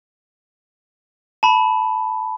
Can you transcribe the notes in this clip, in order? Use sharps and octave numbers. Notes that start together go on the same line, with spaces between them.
A5 B5